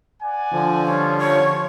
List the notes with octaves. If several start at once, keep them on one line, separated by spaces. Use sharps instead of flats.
D5 F#5 G#5
D3 F3
G3 C#4 F4 C#5
C#5